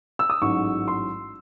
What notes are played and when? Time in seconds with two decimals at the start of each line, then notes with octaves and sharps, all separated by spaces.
0.19 E6
0.30 D#6
0.41 A1 G#2 F#3 C#6
0.88 C6